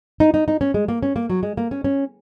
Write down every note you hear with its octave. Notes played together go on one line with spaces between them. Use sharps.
D#4
D#4
D#4
C#4
G#3
A#3
C#4
A#3
F#3
G#3
A#3
C#4
C#4